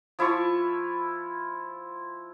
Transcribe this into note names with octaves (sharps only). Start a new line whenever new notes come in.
F3 E4 F4 C#6